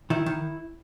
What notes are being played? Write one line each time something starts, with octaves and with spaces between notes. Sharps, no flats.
D#3 E4
D#3